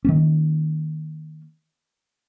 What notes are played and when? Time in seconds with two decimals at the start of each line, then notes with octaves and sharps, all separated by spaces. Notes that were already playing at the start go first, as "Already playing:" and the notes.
0.05 D#3 A#3 C#4